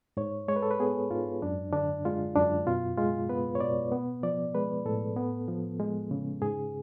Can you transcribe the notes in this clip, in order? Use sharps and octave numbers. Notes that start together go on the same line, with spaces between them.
G#2 C#5
G#3 C#5
B4
A4
B4
B3 G#4
G#2 F4
F#2 D4
D3 D4
G#3 F4
F#2 D4
B2 F4
G#3 F4
B3 B4
C#5
B2 D5
B3
F3 D5
G#3 B4
A2 A4
B3
F3
G#3
C#3
G#2 G#4